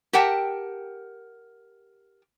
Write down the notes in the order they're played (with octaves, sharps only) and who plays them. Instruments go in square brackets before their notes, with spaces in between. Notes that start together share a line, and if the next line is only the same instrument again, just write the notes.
[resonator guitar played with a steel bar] G4 A#4 E5 F#5 G5 A5